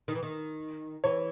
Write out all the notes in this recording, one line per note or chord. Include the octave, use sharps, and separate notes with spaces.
D#3
E3
D#3
E3 C#5